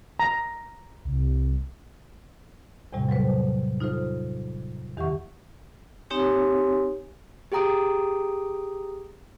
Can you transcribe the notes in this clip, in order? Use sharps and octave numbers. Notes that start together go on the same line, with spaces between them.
A#5
C2
E2 A2 C3 G3
F#3 A4 B4 C5
D#4 F4 A4 C5
E2 D#3 G4 E5 F#5 C#6
C4 D#4 G4 C#5 G#5
G4 G#4 G5 A#5 D#6 D7